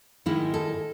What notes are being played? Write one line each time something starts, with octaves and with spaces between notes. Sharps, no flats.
G#2 D#3 G#3 E4
A4